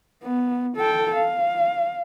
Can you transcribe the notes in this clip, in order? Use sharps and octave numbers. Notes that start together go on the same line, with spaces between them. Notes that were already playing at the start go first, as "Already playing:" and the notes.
B3
A4 G5
F5